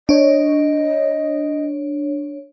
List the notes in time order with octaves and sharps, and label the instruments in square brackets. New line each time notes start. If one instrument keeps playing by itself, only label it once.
[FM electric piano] D4 C#5 [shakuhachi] D#5